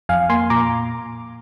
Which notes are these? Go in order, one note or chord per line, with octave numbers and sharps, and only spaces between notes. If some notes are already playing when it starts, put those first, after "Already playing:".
F2 F5 G#5
A#3 G#5 C6
A#2 A#5 D6